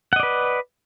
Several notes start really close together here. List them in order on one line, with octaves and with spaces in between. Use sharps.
F#5 D#5 D5 B4